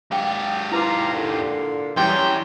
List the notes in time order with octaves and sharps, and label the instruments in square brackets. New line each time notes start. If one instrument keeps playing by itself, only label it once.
[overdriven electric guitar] G#2 G4 [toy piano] F5 G5
[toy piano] E4 B4 D6 [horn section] F4 A#5
[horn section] A#2 D3
[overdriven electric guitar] F#2 [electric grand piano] E3 G3 C#4 [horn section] G5 [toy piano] C6 D6